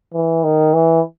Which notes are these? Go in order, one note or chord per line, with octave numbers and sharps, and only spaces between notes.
E3
D#3
E3